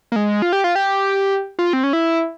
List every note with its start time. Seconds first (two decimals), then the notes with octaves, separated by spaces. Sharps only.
0.12 A#3
0.16 G#3
0.42 F4
0.53 G4
0.64 F4
0.76 G4
1.59 F4
1.73 C4
1.84 C#4
1.93 E4